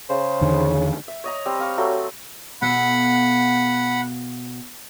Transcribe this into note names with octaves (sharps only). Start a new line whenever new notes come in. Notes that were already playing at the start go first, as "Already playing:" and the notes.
C#3 C5
E2 D3 D#3
E5
C#5 D#5 A#5
G3 C4
C4 F5 C#6
F#3 A3
B2 A4 F5 F#5 B5